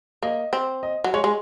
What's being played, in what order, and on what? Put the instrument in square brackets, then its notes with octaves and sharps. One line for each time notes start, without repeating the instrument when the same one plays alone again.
[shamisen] A#3 [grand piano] D#5
[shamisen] C4
[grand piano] D#5
[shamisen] F#3
[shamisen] G#3 [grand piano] C#5
[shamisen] G#3